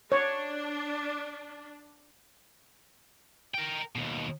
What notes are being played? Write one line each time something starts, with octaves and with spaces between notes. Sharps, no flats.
D4 C#5
A#4 G5
D#2 B2